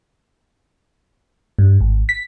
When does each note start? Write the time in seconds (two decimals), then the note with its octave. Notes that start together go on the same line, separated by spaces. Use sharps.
1.59 G2
1.81 G#1
2.09 B6